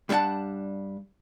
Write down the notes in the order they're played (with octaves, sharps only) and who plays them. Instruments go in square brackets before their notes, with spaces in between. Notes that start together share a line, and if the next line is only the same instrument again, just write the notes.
[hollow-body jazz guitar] G2 G3 D4 E4 F#5 A5